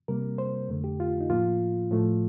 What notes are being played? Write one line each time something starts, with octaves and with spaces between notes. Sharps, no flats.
C3 G3 A#3 A#4
C5
F2 D3 A3
G4
F4
D#4
A2 F3 A#3 F4
A2 F3 A3